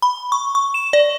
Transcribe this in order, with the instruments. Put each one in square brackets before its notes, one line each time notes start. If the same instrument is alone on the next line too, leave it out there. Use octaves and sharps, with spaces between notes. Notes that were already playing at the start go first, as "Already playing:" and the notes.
[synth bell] B5
C#6
C#6
E7
D5